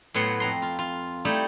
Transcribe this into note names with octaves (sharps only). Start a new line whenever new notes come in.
A2 F#3 B3 F#5 C6
F2 A#5 C6
F4
F4
G3 A3 D#4 E4 G4